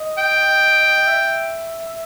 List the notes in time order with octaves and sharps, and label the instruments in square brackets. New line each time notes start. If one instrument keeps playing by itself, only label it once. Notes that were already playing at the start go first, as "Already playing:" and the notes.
Already playing: [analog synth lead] D#5
[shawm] G5
[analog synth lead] E5